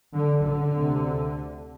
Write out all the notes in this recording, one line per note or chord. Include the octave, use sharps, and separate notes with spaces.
D3
D3
D2 C3